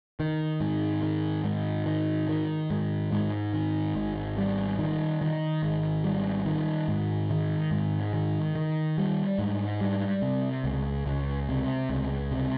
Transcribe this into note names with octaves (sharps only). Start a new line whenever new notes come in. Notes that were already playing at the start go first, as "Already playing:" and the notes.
D#3
G#2
D#3
G#2
D#3
D#3
G#2
G#2
D#3
G#1
G3
D#3
D#3
G#1
G3
D#3
G#2
D#3
G#2
D#3
D#3
G3
G#2
G3
C3
C#2
C#2
C3
C#2
C3